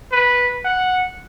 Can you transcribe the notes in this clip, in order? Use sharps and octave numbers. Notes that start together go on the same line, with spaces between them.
B4
F#5